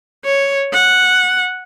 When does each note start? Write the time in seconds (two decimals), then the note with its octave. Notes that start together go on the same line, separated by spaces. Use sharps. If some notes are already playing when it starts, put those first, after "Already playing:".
0.25 C#5
0.73 F#5